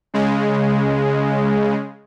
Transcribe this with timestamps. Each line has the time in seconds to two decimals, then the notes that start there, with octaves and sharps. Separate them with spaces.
0.14 C#3 G#3